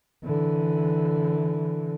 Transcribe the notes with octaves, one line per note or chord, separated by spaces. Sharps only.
D3 E3